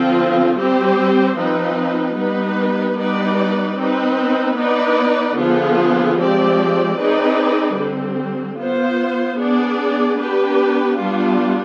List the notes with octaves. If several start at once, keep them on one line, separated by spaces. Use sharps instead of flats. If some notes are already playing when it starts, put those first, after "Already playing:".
Already playing: D3 F3 C4 F4
G3 C4 G4 C5
F3 C4 D#4 B4
G3 B3 D#4 B4
G3 B3 D#4 B4 D5
C4 D#4 B4
B3 D#4 B4 D5
D3 F3 B3 F4 G#4
F3 G#3 C4 G4 D5
C4 D#4 G#4 B4 D5
D3 G3 C4
B3 F4 C5
B3 D4 G#4 D5
B3 D4 G4 B4
G3 B3 D4 F4